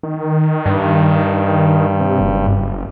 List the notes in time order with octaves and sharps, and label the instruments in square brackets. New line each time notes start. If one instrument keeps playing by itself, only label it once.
[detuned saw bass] D#3
[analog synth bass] G2
[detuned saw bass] C3
F#1